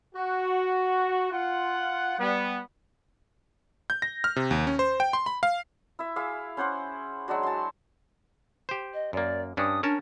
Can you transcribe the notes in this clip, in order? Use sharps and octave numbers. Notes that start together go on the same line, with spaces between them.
F#4
F4 F#5
G3 B3
G6
A#6
F6
C3
D#2
C#4
C5
G5
C6
B5
F5
E4 E5
E4 G#4 F5 D6
C#4 C5 F#5 D6
F#3 G#3 D4 F#4
A5 C6
G4 C5
D#5
F#2 A#3 D5
G2 C#4 D4 D#6
C#4 D4 A#4 A5